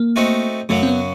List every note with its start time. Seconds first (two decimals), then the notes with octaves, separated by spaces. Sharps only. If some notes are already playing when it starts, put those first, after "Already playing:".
Already playing: A#3
0.16 A3 C4 D#4 F#4
0.69 F#2 C#3 F#3 A3
0.83 C4
0.88 B3